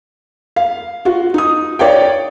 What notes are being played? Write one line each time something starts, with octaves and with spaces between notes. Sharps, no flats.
F5
F4 F#4
D#4 D#6
C#5 D5 F5 G5